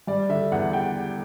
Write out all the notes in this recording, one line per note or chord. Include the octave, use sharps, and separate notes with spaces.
G3 D5
D3 E5
E2 F#5
G5